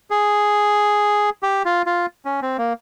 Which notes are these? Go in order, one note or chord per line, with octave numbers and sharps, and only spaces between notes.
G#4
G4
F4
F4
C#4
C4
A#3